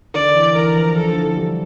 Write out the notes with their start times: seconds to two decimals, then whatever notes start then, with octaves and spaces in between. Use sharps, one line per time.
0.14 D3 D5
0.35 E3
0.55 E3 A#4
0.76 F3
0.96 F3 A4
1.13 D3
1.17 E3
1.37 G3